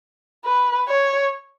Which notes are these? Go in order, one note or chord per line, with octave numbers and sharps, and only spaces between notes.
B4
C#5